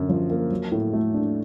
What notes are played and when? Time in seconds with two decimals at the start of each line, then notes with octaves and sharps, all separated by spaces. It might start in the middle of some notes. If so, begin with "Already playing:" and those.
Already playing: F#2 D3
0.09 F3
0.30 A#3
0.51 F#3
0.72 A2
0.93 A3
1.14 D4